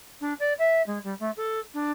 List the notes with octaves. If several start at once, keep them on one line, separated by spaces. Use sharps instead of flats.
D4
D5
E5
G#3
G3
A3
A4
D4